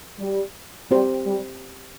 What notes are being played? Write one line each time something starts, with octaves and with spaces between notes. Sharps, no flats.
G3
G3 C4 G4 C5
G3